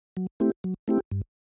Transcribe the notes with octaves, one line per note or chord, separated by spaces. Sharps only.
F#3
A3 C4 E4 G4
F#3
A3 C4 E4 G4
G2